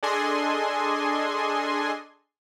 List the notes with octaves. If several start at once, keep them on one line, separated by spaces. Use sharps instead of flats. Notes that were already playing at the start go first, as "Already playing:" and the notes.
D4 G#4 A4 D#5 G#5 C6